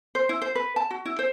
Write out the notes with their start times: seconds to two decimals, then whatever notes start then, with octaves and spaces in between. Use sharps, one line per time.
0.15 C5
0.29 E4
0.42 C5
0.55 B4
0.76 A5
0.91 F#4
1.06 E4
1.19 C5